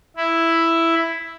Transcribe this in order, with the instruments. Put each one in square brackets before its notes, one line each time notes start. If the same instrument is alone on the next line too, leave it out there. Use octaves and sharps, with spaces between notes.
[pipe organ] E4